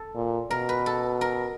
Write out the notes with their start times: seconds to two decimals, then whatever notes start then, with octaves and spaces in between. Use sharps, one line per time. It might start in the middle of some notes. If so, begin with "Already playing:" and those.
Already playing: A4
0.15 A#2
0.50 B2 A#4
0.69 B4
0.86 A4
1.21 A#4